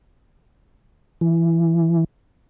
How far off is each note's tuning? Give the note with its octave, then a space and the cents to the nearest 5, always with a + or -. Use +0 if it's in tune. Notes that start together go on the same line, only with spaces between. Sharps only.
E3 +15